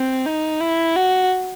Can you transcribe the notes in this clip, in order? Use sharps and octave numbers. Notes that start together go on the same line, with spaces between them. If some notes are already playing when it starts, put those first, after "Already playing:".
Already playing: C4
D#4
E4
F#4